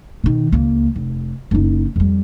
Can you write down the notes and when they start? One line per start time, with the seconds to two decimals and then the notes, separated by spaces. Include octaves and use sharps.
0.24 B2 D#3
0.52 C#2 A#3
0.96 F1
1.51 F#1 D#4
1.96 F2 G3